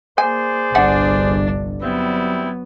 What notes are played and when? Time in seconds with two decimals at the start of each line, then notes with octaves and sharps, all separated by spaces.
0.18 A#3 G#4 C5 D5 G#5
0.75 G1 C2 D4 E5 F#5 G#5
1.82 F#3 G3 B3 C4 E4